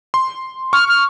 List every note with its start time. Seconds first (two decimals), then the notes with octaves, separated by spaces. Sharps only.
0.14 C6
0.73 C#6 F6
0.89 F6